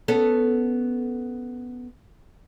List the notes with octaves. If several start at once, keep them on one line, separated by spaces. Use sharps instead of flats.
B3 C#4 A4